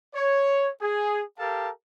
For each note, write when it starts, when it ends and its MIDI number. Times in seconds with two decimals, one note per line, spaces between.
0.14 0.69 73
0.82 1.22 68
1.39 1.70 67
1.39 1.70 69
1.39 1.70 70
1.39 1.70 77
1.39 1.70 81